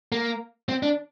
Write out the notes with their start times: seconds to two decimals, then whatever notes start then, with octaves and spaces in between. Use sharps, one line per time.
0.12 A#3
0.69 C4
0.83 D4